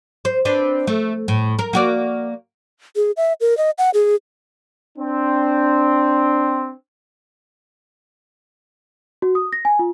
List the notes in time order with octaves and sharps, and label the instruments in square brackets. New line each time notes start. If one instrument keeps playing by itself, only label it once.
[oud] C5
C4 D4 B4
A3
A2
A#4
A#3 F#4 D5
[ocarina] G#4
E5
A#4
D#5
F#5
G#4
[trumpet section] C4 [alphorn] D4
[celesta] F#4
D#6
A#6
G#5
F4